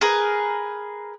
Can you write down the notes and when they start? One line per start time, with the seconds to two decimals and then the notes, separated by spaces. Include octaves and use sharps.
0.01 G#4 A#4 B4